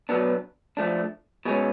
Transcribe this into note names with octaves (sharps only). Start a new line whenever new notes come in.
B2 F#3 B3 D4
F3 A3 D4
B2 G#3 C#4